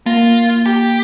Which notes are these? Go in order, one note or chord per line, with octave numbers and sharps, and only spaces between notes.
A#3 F4
G4